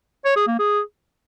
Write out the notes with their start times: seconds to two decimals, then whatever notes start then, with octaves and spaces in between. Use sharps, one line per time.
0.25 C#5
0.36 G#4
0.48 A#3
0.59 G#4